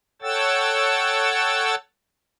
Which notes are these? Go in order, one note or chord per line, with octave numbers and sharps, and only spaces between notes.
A4 C#5 F#5 G5 E6 A6